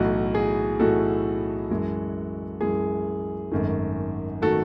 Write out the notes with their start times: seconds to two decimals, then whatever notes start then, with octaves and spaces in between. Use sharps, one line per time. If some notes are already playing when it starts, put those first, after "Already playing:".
Already playing: B1 A2 E3 F#4
0.35 G#4
0.80 B1 A2 E3 F#4 A4
1.70 F#2 E3 G#3
2.61 F#2 E3 G#3 G#4
3.51 G#1 F#2 D#3 A3
4.42 D#3 A3 F#4 A4